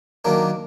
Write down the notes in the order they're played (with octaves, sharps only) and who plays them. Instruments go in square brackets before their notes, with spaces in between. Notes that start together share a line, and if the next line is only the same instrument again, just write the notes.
[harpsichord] D#3 F#3 A#3 D4